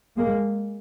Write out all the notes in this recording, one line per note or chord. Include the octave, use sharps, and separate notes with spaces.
G#3 A#3